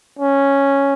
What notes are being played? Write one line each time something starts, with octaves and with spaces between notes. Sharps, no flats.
C#4